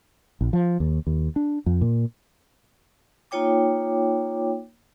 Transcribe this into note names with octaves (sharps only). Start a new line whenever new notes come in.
A#1
F3
D#2
D#2
D4
F2
A#2
A#3 D#4 F4 C#5 G5 D6